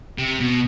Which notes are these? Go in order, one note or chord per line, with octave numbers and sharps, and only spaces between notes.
C3
B2